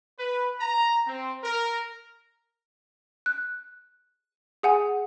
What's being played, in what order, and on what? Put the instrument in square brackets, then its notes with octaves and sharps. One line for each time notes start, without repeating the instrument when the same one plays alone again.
[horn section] B4
A#5
C4
A#4
[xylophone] F#6
G#4 F#5 G#5